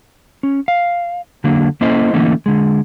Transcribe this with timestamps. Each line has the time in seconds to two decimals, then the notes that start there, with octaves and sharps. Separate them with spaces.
0.43 C#4
0.68 F5
1.44 D3 F#3 A#3 D4
1.81 A#3 C#4 E4 A4 C5 D#5
2.13 D3 E3 A3 A#3 C#4 D#4
2.46 D3 G#3